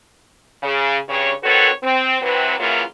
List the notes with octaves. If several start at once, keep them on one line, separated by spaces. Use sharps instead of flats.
C#3
G2 C#3 C#5
D#3 C4 F#4 A4 B4 C#5
C4
C3 E3 F#3 C4 B4
C#3 E3 F#3 A#3 E4 F4